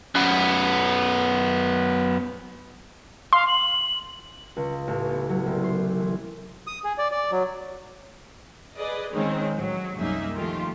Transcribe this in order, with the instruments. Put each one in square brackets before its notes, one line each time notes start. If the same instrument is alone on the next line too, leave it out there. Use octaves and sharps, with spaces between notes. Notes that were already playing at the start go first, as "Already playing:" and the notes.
[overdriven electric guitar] F#2 B3
[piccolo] F5 [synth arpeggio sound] C6
[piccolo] F#7
[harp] C#2
A1
B3
F#3
C2
C6
E3
[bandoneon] D#6
G#4
D5
D5
F#3
[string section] G#4 B4 D5 D#5
D#3 G#3 C4 C#4 D#4
A1 F#3
C2 F#2 A#3 D#4 G#4 E5
D#3 F3 A3 F4 G4